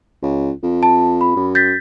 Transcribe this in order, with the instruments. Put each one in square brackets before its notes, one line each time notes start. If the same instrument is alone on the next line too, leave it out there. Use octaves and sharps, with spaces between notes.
[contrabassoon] C#2
F2
[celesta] A5
B5
[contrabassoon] F#2
[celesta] G6 A6 B6